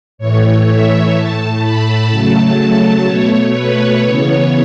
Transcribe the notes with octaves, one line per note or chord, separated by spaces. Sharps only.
A2 E3 A3 C#5
E5
A2 A3 A5
B5
C#3 F#3 A3 A5
B2 A3 C#5
B4
C#3 E3 B3 C#5